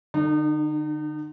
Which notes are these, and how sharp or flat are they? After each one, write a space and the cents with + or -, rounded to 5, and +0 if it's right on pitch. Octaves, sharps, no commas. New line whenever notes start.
D3 +25 D#4 -35